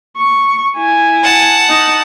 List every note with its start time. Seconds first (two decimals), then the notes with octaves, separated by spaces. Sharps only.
0.17 C#6
0.76 E4 G#5
1.23 F#5 A5
1.69 D#4